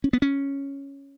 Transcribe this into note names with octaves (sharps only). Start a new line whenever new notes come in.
C#4
B3
C#4